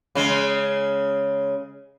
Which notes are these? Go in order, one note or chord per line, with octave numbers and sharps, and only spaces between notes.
C#3 G#3